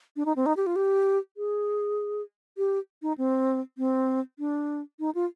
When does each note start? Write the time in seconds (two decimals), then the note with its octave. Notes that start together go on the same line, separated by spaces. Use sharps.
0.16 D4
0.26 D#4
0.36 C4
0.46 D#4
0.57 G4
0.66 F4
0.76 G4
1.37 G#4
2.58 G4
3.02 D#4
3.18 C4
3.78 C4
4.39 D4
5.00 D#4
5.15 F4